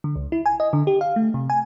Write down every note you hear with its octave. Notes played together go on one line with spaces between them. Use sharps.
D3
C#2
E4
G#5
D#5
D3
G4
F5
A3
C3
G#5